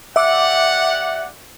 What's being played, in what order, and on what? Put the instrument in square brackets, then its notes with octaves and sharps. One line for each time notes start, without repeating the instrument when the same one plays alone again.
[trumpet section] G4 D5 F#5 [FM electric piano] E5 D6